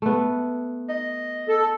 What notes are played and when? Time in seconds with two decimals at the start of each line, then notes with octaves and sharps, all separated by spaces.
0.02 A3 B3
0.89 D#5
1.48 A4